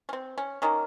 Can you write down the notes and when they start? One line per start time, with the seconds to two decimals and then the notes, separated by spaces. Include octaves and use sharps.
0.09 C#4
0.13 C4
0.38 C#4
0.62 D#3 A#3 C#4